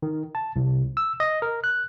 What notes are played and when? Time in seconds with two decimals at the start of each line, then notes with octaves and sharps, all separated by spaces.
0.03 D#3
0.35 A5
0.56 C2
0.97 E6
1.20 D#5
1.42 A#4
1.64 F#6